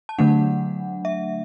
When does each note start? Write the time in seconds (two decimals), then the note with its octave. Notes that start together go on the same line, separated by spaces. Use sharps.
0.09 A5
0.18 D3 F#3 A3 D4 F#5
1.05 E5